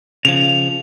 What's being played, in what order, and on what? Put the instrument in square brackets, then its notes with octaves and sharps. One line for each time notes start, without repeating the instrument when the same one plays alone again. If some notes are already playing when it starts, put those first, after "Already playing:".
[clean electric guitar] C#3 F3 [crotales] F7